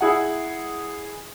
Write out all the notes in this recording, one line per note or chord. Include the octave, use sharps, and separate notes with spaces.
E4 G#4 F#5